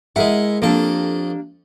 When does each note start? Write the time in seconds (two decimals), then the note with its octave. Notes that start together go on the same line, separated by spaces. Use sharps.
0.16 G#3 E4 G#4 A#4 F#5
0.62 F2 A#3 D4 G4 A4